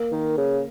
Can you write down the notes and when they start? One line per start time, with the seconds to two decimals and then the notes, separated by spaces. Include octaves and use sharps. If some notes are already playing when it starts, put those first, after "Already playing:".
Already playing: A#3
0.11 D#3
0.38 C#3